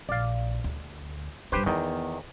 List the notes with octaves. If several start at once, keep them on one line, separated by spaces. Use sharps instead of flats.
A#1 D5 F5
D2
G2 D4 G4 B4 C5
E2 D#3 B3